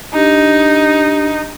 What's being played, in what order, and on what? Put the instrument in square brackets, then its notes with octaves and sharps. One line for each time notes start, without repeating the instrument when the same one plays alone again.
[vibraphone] D4 G4 [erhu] D#4